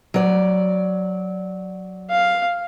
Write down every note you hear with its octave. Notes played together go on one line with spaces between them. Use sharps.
F#3 D5
F5